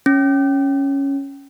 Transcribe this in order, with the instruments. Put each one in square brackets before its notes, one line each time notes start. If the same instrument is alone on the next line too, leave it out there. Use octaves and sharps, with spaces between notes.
[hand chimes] C#4